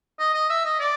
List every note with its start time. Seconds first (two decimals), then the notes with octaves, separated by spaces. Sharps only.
0.19 D#5
0.34 D#5
0.50 E5
0.65 D#5
0.80 D5